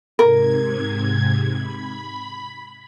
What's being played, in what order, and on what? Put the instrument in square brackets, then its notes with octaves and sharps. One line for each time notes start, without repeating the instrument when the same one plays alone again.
[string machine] G#2 C3 G#6 [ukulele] A#4
[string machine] B5